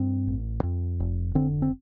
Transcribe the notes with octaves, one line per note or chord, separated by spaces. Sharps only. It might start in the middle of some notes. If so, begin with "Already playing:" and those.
Already playing: G2 C4
A1
F2
F1
D3 C4
C4